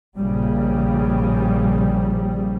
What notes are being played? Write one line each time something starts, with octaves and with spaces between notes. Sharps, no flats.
A#1 C#3 G3